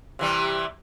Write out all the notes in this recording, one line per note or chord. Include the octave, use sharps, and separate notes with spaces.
C3 E3 G3